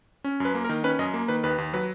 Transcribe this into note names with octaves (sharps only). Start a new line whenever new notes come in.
C#4
F#2 B4
A#3
A#4
D#3
C#4 B4
F#2 D#5
A#3
D#3 B4
D#2 B4
D#2
F#3 B4